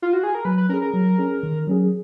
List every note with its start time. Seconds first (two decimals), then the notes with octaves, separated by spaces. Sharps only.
0.02 F4
0.13 F#4
0.23 G#4
0.35 A#4
0.45 F#3 B4
0.58 B4
0.69 C#4 A#4
0.73 G#4
0.82 A#4
0.94 F#3
1.18 C#4 G#4
1.43 D#3
1.67 F#3 C#4 G#4